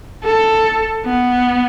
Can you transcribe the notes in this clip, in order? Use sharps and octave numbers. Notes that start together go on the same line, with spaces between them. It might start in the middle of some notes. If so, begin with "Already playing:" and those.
A4
B3